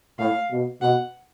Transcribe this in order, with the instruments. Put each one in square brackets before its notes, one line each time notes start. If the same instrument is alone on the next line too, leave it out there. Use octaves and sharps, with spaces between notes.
[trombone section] A2 [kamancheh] F5
[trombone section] B2
[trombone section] B2 [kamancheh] F#5